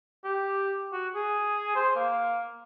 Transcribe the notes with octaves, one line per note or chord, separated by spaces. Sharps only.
G4
F#4
G#4
C5
A#3